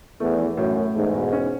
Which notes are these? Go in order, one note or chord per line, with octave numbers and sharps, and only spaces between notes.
E2 A3
E3
F#2 A2
A2
E2 G#2 A3
B2
C#4